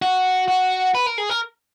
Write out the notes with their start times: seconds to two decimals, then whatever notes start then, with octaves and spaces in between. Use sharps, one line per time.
0.02 F#4
0.48 F#4
0.95 B4
1.06 A#4
1.18 G#4
1.30 A#4